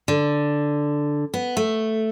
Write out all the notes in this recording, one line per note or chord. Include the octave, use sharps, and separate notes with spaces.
D3
B3
A3